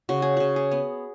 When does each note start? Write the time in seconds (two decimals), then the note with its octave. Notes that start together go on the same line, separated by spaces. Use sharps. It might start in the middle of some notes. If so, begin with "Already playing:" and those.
0.09 C#3 F#4
0.22 G#4
0.37 C#3 F#4
0.56 G#4
0.71 B3